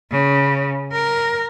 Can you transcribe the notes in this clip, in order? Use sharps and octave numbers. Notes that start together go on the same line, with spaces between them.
C#3
A#4